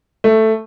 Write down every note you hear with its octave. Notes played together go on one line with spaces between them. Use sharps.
A3